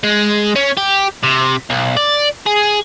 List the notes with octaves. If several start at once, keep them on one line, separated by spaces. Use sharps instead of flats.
G#3
C#4
G4
C3
B1
D5
G#4